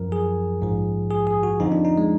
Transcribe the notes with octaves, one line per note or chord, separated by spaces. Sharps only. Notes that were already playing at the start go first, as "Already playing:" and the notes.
Already playing: F#2 F3 A#4
G#4
A#1 G#2 F3
G#4
G#4
F#4
F2 D3 F3 D#4
D4
D#4
G#3